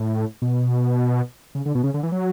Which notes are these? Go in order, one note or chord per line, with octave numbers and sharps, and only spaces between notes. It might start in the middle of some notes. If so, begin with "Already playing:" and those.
Already playing: A2
B2
C#3
D3
B2
C#3
D3
E3
F#3